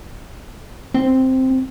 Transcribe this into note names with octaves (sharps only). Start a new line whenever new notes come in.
C4